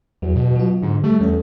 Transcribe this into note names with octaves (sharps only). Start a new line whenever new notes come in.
E2 F#3
B2
F#3 F4
G#2 D3
G3 A3
E2 C#4 A4